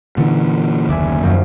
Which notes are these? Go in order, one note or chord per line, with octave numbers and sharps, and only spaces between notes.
A#2 D3 E3
F#1 D#2 D5 E5 G#5
F#2 F3 F#3